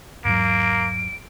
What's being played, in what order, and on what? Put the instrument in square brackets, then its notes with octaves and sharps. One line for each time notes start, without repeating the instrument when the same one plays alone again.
[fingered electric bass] E2 G#2 F#3 [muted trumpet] A#3 [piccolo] D7